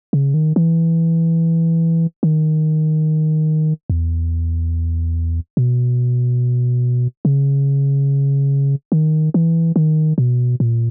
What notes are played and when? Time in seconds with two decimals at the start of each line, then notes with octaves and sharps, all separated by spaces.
0.13 C#3
0.34 D#3
0.56 E3
2.23 D#3
3.90 E2
5.57 B2
7.25 C#3
8.92 D#3
9.34 E3
9.76 D#3
10.18 B2
10.60 A#2